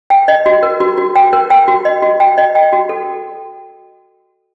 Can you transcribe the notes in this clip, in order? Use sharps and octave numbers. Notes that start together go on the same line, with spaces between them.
G5
D#5
F#4
A#4
F#4
F#4
G5
A#4
G5
F#4
D#5
F#4
G5
D#5
G5
F#4
A4